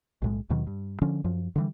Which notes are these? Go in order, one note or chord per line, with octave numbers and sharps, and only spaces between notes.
B1 A2 G#3
D#2 B2 D#3 F#3
G2
D3 F3 C#4
F#2 F3
D3 E3 G3